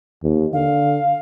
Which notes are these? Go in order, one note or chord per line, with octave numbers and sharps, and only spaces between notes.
D#2
D3 F5